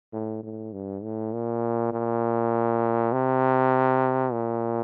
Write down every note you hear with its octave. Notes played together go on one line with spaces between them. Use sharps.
A2
A2
G2
A2
A#2
A#2
C3
A#2